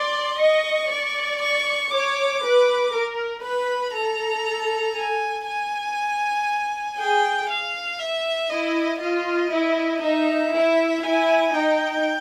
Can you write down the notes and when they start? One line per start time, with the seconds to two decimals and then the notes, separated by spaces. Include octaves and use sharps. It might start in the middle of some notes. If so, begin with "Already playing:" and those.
Already playing: D5 C6
0.39 D#5 C#6
0.90 D5
1.41 C#6
1.91 C#5 D6
2.42 B4
2.93 A#4
3.43 B4 B5
3.94 A4 A#5
4.95 G#5
5.46 G#5
6.98 G#4 G5
7.49 F5
7.99 E5
8.50 E4 D#5
9.01 F4 D#5
9.51 E4
10.02 D#4 E5
10.53 E4
11.04 E4 G#5
11.54 D#4 G5